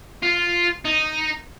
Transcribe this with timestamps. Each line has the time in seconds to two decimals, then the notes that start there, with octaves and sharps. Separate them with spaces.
0.23 F4
0.85 D#4